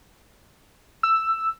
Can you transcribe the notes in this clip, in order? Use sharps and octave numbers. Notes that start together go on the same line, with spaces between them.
E6